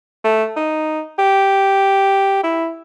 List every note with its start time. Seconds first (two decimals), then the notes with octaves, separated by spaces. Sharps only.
0.24 A3
0.56 D#4
1.19 G4
2.44 E4